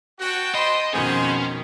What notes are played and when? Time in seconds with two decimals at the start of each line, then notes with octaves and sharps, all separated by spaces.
0.20 F#4 G5 A5
0.55 C5 D#5 B5 C6
0.93 F2 B2 D#3 B3 C#4 G#4 C5